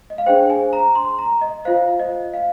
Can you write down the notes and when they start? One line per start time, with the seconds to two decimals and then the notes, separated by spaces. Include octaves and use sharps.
0.10 D#5
0.18 F5
0.26 D4 G#4 C5 G5
0.50 G#5
0.73 A#5
0.95 C6
1.19 A#5
1.41 D#5
1.65 F4 C5 F5
2.00 D#5
2.34 F5